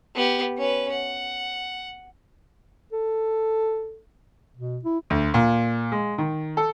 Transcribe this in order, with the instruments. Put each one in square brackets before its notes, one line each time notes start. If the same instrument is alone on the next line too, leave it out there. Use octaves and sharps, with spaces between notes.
[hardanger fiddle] B3 G4
C#4 B4
F#5
[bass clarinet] A4
B2
E4
[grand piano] D2
A#2
G#3
D#3
A4